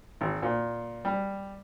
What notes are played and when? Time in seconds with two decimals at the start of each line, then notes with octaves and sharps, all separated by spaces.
0.21 G#1
0.42 A#2
1.05 G3